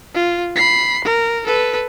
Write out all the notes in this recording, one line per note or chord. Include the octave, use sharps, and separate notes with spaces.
F4
B5 C7
A#4
A4 B4